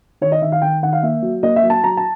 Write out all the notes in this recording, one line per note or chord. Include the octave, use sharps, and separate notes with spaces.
D#3 C#5
D#5
D#3 E5
F5
D#3 G5
D#3 F#5
F5
A#3 E5
F#3
A#3 D#5
E5
F#3
A5
F#3 A#5
A5